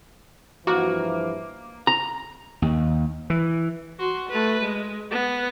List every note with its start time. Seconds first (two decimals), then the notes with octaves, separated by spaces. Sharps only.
0.67 G2 E3 F3 A#3 F#4
1.87 A#5
2.62 D#2
3.30 E3
3.99 F#4 C6
4.29 A3 B4
4.62 G#3
5.11 B3